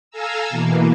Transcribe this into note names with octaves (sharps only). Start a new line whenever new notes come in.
A4 F5 G#5 A#5 E6
B2 E3 A#3